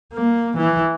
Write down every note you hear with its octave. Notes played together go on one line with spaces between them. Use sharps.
A#3
E3